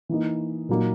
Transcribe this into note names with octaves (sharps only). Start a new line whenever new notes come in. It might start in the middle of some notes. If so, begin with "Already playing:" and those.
E3 A#3 D#4
A#2 F#3 A#3 D#4